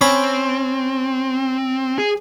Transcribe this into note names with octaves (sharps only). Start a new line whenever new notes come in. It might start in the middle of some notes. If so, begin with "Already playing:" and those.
C4 C#4 B5
G#4